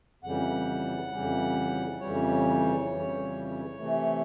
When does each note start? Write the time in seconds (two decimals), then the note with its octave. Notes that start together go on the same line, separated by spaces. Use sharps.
0.23 F2 C#3 E3 G3 F#5
1.12 F2 C#3 E3 G3
2.01 F2 C#3 E3 G3 C#5
2.90 F2 C#3 E3 G3
3.79 C3 E3 A3